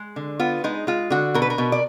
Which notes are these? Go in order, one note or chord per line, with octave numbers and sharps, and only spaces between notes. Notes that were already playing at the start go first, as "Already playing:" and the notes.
Already playing: G#3
D3
B3 F4
G#3 D#4
G#3 F4
D3 F#4
B2 A#4
B4
A#4
B2
D5